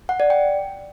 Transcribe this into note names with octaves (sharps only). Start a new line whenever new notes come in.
F#5
D5
G5